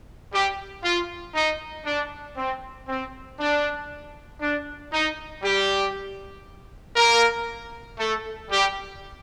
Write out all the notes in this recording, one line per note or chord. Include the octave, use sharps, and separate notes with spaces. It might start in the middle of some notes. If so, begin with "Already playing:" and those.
G3 G4
F4
D#4
D4
C4
C4
D4
D4
D#4
G3 G4
A#3 A#4
A3 A4
G3 G4